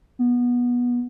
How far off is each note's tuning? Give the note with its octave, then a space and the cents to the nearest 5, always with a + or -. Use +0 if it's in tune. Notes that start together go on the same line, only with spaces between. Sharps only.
B3 -20